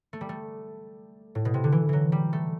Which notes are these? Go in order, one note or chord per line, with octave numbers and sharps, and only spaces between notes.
A3
G3
A3
A2
B2
C3
D3
E3
E3 F#3
G3
A3